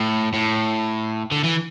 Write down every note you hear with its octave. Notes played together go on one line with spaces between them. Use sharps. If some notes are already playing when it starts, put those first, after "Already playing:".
Already playing: A2
A2
D3
E3